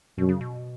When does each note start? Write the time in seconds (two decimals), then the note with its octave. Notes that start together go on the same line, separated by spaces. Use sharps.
0.18 F#2 B2
0.29 C#3
0.41 B2